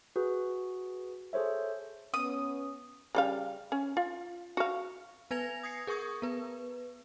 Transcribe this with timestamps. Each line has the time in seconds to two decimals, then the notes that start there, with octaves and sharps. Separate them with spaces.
0.16 F#4 G#4 B4
1.33 G#4 A4 C5 C#5 E5
2.14 B3 C#4 D#6
3.15 C#3 G3 F5
3.72 C#4
3.97 F4
4.57 F#4 F5
5.31 B3 B4 G#5 G#6 A#6 F7
5.63 D#6 G#6 A#6 C7 C#7
5.87 G#4 A#4 C#6 D#6 G#6
6.22 B3 B4